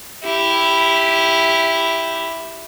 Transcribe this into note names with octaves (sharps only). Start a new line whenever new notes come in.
E4 G4